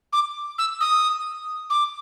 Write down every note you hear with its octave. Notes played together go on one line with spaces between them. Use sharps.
D6
E6
D#6
D6